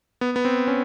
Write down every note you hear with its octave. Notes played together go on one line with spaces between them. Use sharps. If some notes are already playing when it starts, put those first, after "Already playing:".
B3
B3
C4
C#4